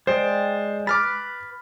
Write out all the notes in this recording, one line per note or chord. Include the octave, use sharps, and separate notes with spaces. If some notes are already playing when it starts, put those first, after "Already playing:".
G#3 C5 D5 G5
B4 B5 D6 F6 A6